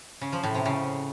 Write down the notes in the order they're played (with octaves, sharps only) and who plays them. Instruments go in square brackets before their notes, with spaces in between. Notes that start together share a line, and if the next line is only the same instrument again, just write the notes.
[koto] C#3
F3
A2
C3
C#3